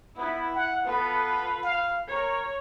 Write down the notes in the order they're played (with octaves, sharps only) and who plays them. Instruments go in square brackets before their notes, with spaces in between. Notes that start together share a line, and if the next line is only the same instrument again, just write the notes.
[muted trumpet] B3 [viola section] E4
[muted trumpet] F#5
[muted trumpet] B3 [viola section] F4 A4 B4
[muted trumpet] F5
[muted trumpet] A#4 [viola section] C#5